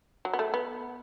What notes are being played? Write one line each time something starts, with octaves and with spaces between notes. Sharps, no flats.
F#3
B3
A3
B3